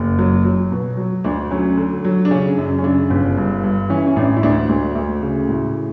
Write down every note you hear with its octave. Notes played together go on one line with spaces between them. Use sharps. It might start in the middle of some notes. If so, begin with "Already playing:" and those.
Already playing: F#1
F#3
F#3
B2
F#3
D2 D4
F#3 C#4
D3
F#3
D4
C#3 C#4
F#2
C#4
C#3 D4
G1
G2
G2
E3 C#4
C#4
A1 D4
E4
D2 D4
D2
D2
C#3
A2